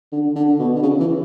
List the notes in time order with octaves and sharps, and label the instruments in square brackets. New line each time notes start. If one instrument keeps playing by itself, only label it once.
[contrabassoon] D3
D3
B2
D3
C#3
E3